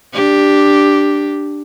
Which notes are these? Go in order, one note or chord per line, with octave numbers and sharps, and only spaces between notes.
D4 G4